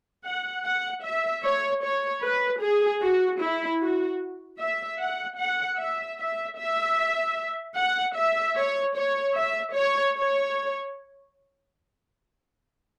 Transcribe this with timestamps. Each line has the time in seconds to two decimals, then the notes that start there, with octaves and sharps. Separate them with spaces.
0.24 F#5
0.64 F#5
1.03 E5
1.43 C#5
1.82 C#5
2.22 B4
2.61 G#4
3.01 F#4
3.40 E4
3.81 F#4
4.60 E5
5.00 F#5
5.39 F#5
5.79 E5
6.19 E5
6.58 E5
7.77 F#5
8.16 E5
8.56 C#5
8.95 C#5
9.35 E5
9.75 C#5
10.14 C#5